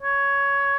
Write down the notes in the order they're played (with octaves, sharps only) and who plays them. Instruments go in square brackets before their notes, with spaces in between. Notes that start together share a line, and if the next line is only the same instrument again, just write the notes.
[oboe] C#5